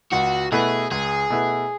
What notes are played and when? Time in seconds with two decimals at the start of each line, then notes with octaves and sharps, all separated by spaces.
0.12 C#2 F#4
0.52 B2 A3 E4 G#4 B4
0.91 C#2 G#4
1.30 B2 A3 E4 B4